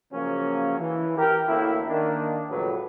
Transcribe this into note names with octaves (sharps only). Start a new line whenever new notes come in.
C#3 F3 F#3 A#3 C#4
E3
G4 A#4
A1 D2 A2 A#3 E4
D#3 A#3 D4
C#2 A2 C#3 F3 F#3 B4